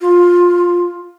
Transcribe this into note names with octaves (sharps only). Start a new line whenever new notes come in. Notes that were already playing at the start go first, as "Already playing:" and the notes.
F4